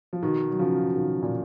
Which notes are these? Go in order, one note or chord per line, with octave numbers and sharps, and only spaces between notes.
F3
B2 D#3
F#3
C#3 F3
B2 D#3
A#2